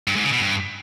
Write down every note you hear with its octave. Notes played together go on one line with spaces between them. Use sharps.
G2
G#2
C#3
B2
G2